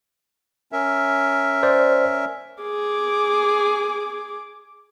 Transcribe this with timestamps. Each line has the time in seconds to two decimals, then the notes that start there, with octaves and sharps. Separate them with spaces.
0.72 C#4 A#4 E5
1.63 C5 D5
2.62 G#4 D6